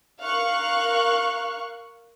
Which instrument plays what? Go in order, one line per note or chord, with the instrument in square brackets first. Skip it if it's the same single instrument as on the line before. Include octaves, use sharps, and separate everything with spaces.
[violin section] A#4 F5 C#6 F#6